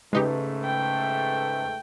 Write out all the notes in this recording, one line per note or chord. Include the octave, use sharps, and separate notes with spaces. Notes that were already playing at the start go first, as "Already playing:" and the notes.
G#2 C#3 G#3 A3 D#4 G4 B4
G5